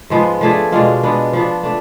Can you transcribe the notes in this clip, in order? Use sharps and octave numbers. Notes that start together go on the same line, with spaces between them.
G#2 F3 G#3 B3
F3 A3 D4 G#4
B2 G#3 D4 F4
G#3 B3 D4
F3 B3 D4
A3 D4